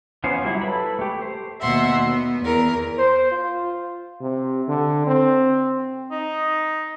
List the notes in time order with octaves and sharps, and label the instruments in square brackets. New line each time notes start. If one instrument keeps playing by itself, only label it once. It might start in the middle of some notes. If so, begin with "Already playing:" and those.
[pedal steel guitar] E3 B3 C#4 F4 C5
F#3 G3 E4
A4 B4 B5
A3 G4
C5
[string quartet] D#2 B2 E5 F#5 C6
B3
E2 A#4
[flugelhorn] C5
F4
[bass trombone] C3
D3
C4
[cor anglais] D#4